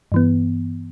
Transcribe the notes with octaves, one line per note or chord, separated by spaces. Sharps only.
G2 E3 B3